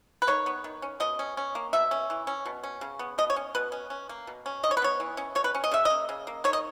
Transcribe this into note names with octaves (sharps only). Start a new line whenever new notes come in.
B4
D#3 C#5
B3
D#3
C#4
B2 D#5
C#4
C#4
A#3
B2 E5
C#4
E3
C#4
B2
C#4
C#3
B3
B2 D#5
C#5
C#4
B2 B4
C#4
C#4
A#3
B2
C#4
D#3 D#5
C#5
B4
B3 C#5
E3
C#4
B2 C#5
B4
C#4
D#5
C#3 E5
A#3 D#5
C#3
A#3
D#3 C#5
D#5